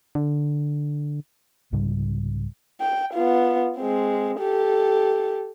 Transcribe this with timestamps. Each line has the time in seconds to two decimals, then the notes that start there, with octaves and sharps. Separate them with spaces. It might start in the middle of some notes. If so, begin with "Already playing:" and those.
0.15 D3
1.72 C2 G#2 C#3 G3
2.81 G5
3.14 B3 F4
3.78 G#3 C4
4.39 G4 A4